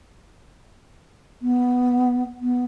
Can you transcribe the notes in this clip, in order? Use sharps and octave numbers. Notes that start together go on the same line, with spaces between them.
B3
B3